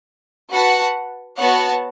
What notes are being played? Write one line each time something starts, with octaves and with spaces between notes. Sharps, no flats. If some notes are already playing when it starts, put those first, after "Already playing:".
F#4 B4 F#5 A5
B3 F#4 C#5 F#5 A5